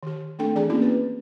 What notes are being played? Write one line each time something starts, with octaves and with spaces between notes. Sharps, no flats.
D#3 G4
A3 C4 D4 A4 G5
E3 D4 G#4 D5 G#5 A#5
A#3 C4 C#4 E4 F#4
B4